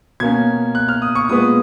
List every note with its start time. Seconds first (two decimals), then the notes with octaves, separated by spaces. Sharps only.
0.20 B2 A#3 C#4 G#6
0.75 F#6
0.88 F6
1.02 D#6
1.15 C#6
1.29 A#2 G#3 B3 D#6